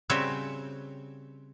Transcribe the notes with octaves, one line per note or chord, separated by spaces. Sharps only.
C#3 G3 C4 F#4 C#5 E5